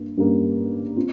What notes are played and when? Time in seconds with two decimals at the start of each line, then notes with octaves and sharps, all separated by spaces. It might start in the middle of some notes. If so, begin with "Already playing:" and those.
Already playing: G2 A#3
0.17 G2 G3 A#3 C#4
0.96 C4 F4